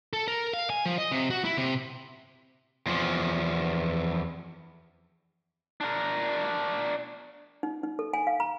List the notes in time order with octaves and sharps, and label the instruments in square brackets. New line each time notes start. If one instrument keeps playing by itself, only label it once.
[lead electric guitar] A4
A#4
F5
G#5
F3
D#5
C3
F#4
E4
C3
[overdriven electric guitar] E2 F3
[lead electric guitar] D4 A#4
[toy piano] D#4
D#4
A4
G#5
F5
A#5